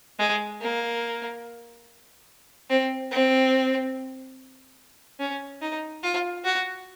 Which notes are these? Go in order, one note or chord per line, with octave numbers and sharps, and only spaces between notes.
G#3
A#3
C4
C4
C#4
D#4
F4
F#4